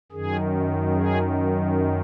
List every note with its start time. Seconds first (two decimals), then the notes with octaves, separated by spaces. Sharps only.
0.12 F#2 D#3 G#4
0.94 G#4